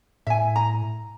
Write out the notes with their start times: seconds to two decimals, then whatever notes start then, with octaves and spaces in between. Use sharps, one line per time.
0.27 A2 E5 G#5
0.56 A#5